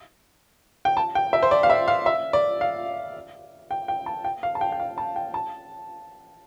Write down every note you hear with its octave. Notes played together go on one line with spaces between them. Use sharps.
G5
A5
G5
E5
C5
D5
F5
E5
F5
E5
D5
F5
G5
G5
A5
G5
F5
A5
G5
G5
F5
A5
G5
A5